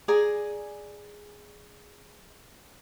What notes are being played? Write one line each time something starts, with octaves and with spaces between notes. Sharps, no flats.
G#4 D5 G#5 A#5